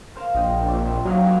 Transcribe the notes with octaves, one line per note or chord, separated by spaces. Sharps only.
A#4 C5 F5
A#1 D#5 G5
C4 D5 E5
F#3 D4 D#4 F5
G3 A#3 D6